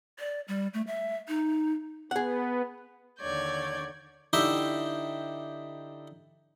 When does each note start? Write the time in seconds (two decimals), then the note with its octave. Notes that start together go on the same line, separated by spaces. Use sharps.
0.19 D5
0.48 G3
0.74 A3
0.87 E5
1.28 D#4
2.11 B3 G#4 F#5
3.19 D#2 D3 C#5 D5 G6 G#6
4.33 D3 D#4 E4 G4 E5 G5